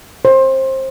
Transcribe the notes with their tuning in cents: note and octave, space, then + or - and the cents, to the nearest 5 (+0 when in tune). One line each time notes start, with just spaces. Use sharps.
C5 +25